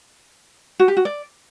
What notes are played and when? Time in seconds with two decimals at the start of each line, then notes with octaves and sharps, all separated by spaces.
0.80 F#4
0.88 G4
0.97 F#4
1.05 D5